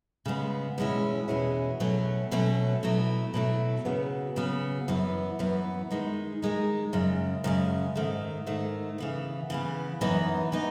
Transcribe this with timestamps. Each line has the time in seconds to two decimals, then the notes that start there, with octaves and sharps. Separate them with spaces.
0.26 C#3 G#3 B3
0.78 E2 B2 G#3 C#4 E4
1.28 E2 B2 G#3 C#4 E4
1.80 B2 F#3 A3 C#4
2.31 B2 F#3 A3 C#4
2.83 B2 F#3 A3 E4
3.34 B2 F#3 A3 E4
3.85 C#3 F#3 B3
4.36 C#3 F#3 B3
4.88 F#2 E3 B3
5.39 F#2 E3 B3
5.91 D#3 G#3 D#4
6.42 D#3 G#3 D#4
6.93 F#2 C#3 G#3
7.44 F#2 C#3 G#3
7.96 G#2 D#3 A3
8.47 G#2 D#3 A3
8.98 C#3 E3 B3
9.50 C#3 E3 B3
10.01 F#2 E3 B3 D#4
10.52 E3 B3 D#4